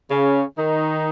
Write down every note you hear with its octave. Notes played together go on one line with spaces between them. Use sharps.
C#3 C#4
D#3 D#4